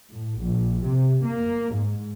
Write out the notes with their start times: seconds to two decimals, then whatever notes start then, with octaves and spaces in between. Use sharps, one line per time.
0.11 A2
0.42 A#1
0.88 C3
1.26 A#3
1.76 G#2